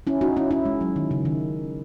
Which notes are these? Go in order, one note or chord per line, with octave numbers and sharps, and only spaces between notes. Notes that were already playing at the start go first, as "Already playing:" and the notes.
C#4 E4
D#4 F#4
C#4 E4
C#4 E4
G#3
F#3
D#3
C#3
D#3